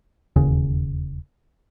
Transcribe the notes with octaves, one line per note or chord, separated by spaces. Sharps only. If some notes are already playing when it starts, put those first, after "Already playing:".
E1 D#2 C#3